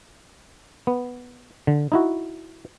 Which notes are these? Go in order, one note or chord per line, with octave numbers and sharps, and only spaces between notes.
B3
D3
D#4 E4 F#4